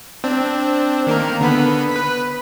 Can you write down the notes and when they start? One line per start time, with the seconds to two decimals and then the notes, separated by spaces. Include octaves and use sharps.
0.24 C4 D4
1.07 D#3 A#3 A#4
1.41 D3 B3 B5
1.91 B4 B6